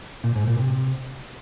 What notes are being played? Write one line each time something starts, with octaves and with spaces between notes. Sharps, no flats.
A#2
G#2
A#2
C3